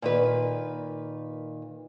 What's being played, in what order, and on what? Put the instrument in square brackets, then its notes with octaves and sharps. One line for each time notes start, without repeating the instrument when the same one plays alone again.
[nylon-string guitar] A#2 D#3 B4